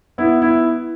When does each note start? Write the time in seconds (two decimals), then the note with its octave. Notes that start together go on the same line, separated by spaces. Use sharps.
0.18 B3 E4
0.42 E4